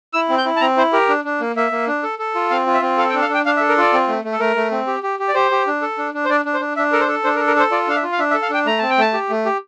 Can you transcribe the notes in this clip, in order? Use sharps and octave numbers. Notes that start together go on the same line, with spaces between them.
E4 E6
C4
G6
E4
A5
C4 A#5
E4 C5
G4 A#4
D4
D4
A#3
A#3 E5
A#3
D4
A4
A4
F4
C4 F5
F4
E5
C4
A4 F5
G5
D4
F5
D4
G5
D4 F5
E5
A4
A#4
F4 D5
C4
A3
A3
A4
A3 A#4
A3
C4
G4
G4
G4
D5
G4 C5
G4
D4
A4
D4
D4
C5
D4 D5
D4
C5
D4
D4 E5
A4 A#4
C5
A4
D4 C5
A#4
A4
A#4
A4 C5
F4 D5
D4 F5
E5
F4
F5
D4 E5
E5
A4
F5
D4 G5
A3 A#5
C4 A5
G5
A3 A5
G4
A3
G4